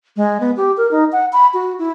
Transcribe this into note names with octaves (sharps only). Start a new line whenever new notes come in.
G#3
B3
G4
A#4
D#4
F#5
B5
F#4
E4